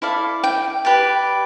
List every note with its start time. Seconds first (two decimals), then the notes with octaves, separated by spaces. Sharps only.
0.02 E4 A4 D5 F5
0.44 G5
0.85 G4 B4 D5